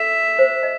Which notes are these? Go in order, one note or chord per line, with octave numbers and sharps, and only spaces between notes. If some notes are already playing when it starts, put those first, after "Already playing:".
Already playing: A4 E5
C5
D#5